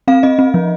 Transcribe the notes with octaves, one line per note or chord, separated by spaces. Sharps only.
C4 F5
C4 D#5
C4
F3